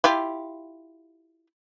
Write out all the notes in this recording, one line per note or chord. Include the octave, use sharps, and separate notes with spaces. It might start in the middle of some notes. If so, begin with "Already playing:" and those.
E4 F4 G4